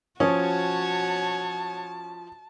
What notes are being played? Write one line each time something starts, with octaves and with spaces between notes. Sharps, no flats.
F3 C#4 F#4 C#5 A5 D#6